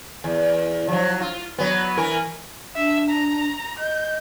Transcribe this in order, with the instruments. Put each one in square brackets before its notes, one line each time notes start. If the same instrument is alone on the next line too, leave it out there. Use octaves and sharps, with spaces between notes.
[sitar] E2
F3 F#3
F4
F#3 B3
E3 A#4
[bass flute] D4 [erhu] E5
[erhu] A#5
[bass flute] D#5 [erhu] G6